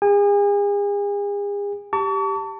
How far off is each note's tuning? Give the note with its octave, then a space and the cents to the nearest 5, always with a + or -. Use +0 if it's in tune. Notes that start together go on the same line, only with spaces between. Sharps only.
G#4 -40 G#5 -40
G4 +0 A5 +25 C#6 +45